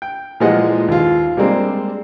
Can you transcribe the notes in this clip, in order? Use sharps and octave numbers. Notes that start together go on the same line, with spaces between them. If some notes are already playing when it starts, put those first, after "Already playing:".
G5
A#2 E3 F3 G#3 D#5 F#5
D#2 F4
G3 G#3 A#3 C4 D4